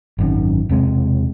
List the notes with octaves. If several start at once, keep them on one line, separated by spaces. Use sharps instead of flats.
G#1 F#2 D#3
E1 C3 G#3